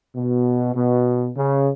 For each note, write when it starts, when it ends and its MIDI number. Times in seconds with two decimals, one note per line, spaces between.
0.15 0.71 47
0.75 1.30 47
1.36 1.70 49